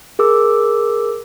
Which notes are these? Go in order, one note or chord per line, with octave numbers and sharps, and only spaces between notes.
G#4 A#4 D6 E6